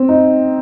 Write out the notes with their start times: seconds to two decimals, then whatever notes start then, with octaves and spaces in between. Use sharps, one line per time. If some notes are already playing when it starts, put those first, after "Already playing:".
Already playing: C4
0.09 D#4